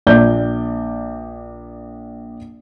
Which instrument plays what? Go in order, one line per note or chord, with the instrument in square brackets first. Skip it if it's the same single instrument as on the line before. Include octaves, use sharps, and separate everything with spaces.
[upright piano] A#1 D5 G6